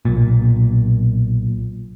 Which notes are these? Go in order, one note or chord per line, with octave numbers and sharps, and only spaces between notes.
B1 A#2